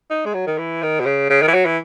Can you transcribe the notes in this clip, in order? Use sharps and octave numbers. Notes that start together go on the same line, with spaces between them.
D#4
G#3
F#3
D#3
E3
D#3
B2
C#3
C#3
D#3
E3
F#3
E3